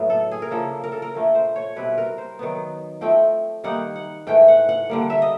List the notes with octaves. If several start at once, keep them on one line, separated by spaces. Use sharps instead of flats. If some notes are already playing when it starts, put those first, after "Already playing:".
Already playing: A2 F#3 B3
A4
G#4
A#4
C#3 F3 A#3 D4 A4
A#4
A4
A#4
A#2 F3 A3 D4
C5
C#5
B2 G3 C4 E4 B4
A#4
C5
D#3 F#3 B3
F3 A3 C4 G5
D#3 G3 A#3 D#4 F#5
F#5
G#2 E3 A3 G5
F#5
F#5
D3 G3 A#3
E5
D#5